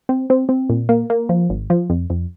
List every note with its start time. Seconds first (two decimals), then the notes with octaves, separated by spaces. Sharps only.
0.09 C4
0.30 C4
0.49 C4
0.70 A#2
0.89 A#3
1.10 A#3
1.29 F3
1.49 G#1
1.70 F3
1.90 F2
2.10 F2